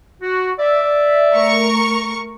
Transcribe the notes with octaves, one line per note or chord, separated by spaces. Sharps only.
F#4
D5 E5
A3 A#4 C#6